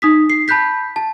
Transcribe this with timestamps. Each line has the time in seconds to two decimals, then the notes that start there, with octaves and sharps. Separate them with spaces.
0.02 D#4 D#6 B6
0.30 C7
0.48 A5 B5 F#6 G6 B6
0.96 A5